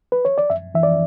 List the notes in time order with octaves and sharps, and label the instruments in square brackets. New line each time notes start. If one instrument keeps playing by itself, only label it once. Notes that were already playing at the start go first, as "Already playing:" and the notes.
[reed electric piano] B4
C#5
D5
F#2 E5
E3 E5
D5